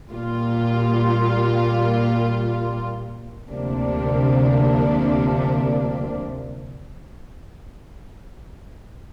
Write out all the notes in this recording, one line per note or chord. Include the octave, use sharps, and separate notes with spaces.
A#2 G3 A#3 F4
D2 C3 F3 A#3 D4